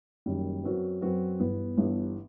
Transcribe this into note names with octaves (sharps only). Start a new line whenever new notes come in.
F#1 F#2 D#3 G3
F#2 F#3 C4 F#4 B4
F#2 F#3 C4 F#4 B4
G1 G2 E3 B3
G1 G2 E3 B3